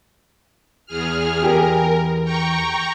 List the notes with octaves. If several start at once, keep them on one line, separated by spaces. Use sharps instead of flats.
E2 G#4 F6
E2 G4 G#4 A#4
G5 A#5 C#6